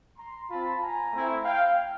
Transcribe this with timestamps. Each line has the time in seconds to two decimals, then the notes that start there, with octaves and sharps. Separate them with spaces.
0.17 A#5 C6
0.49 C4 F4 A5 B5
0.81 G#5 A#5
1.12 A3 C4 E4
1.44 F5 G5